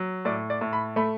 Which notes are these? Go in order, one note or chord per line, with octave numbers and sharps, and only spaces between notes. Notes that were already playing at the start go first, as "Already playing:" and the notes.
Already playing: F#3
A2 D5
D5
A2
B5
A3 B5